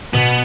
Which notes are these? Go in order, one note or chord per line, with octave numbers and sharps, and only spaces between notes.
B2 B3